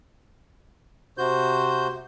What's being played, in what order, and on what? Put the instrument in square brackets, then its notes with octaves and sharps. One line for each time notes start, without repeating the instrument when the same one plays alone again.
[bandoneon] C3 F#4 C5 G6